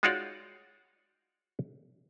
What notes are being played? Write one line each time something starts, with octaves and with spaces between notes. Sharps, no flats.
G#3 D#4 F4 F#4 C#5 D5